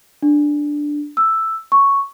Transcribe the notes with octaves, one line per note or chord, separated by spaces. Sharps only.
D4
E6
C#6